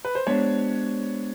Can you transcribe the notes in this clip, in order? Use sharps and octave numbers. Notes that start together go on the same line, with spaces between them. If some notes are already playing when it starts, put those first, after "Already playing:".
B4
C5
G#3 B3 D4 G4 C5 C#5